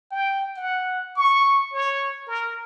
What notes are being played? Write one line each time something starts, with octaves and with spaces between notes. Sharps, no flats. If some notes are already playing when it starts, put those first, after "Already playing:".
G5
F#5
C#6
C#5
A#4